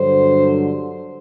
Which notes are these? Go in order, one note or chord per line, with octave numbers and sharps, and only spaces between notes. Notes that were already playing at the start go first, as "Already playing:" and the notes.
Already playing: G2 D3 F#3 C5